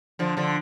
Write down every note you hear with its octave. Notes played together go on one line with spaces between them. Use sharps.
D3 F3
D3 F3